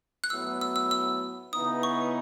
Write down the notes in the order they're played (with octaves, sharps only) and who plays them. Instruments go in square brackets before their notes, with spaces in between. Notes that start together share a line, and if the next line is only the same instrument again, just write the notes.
[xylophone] F#6
[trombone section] A2 F#3 B3 [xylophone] E6
[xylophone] E6
E6
E6
[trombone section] C#3 E3 B3 D#4 [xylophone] D#6
[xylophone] C#6